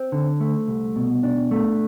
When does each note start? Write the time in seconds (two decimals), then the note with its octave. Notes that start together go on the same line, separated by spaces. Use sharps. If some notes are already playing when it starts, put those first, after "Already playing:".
Already playing: C4
0.12 D3
0.40 A3
0.68 C2
0.96 B2
1.23 D4
1.51 A3